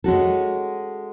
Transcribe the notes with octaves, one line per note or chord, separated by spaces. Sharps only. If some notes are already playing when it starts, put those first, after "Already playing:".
G#3 C#4 F#4 A4